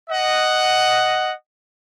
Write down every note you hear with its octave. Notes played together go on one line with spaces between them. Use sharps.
D#5 F#5